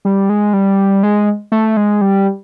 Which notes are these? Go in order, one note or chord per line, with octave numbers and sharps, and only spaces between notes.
G3
G#3
G3
G#3
A3
G#3
G3